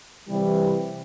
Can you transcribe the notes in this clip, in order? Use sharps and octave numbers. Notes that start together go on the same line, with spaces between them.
C3 E3 G3